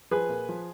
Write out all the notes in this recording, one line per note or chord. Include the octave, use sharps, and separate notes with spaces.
F3 G#4 B4
A#2
F3